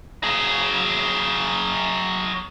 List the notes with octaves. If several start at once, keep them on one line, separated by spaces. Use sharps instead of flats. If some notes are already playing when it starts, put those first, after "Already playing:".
F#3 G#4